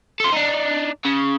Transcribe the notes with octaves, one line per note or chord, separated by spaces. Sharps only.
A4 C5
D4 D#4
C#3